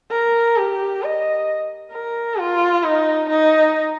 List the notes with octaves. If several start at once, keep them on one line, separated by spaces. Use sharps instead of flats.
A#4
G4
D#5
A#4
F4
D#4
D#4